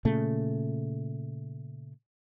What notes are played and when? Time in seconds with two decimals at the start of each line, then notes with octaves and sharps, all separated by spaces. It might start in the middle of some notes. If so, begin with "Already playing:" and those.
0.05 A#2 C#3 A3